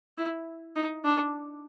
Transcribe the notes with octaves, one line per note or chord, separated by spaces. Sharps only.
E4
D#4
D4